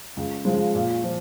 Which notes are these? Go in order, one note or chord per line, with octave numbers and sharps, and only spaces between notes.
C#2
C#3 F3 G#3
A#2
F3